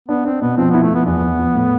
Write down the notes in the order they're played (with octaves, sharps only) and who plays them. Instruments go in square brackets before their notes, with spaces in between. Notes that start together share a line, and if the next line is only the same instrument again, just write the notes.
[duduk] B3 [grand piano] D4
[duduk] C4 [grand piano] D4
[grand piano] B2 [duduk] B3
[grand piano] F3 [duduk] C4
[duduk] B3 [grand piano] E4
[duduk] A3
[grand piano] F3 [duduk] B3
[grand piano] E2 [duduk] B3
[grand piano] E2
F3
A2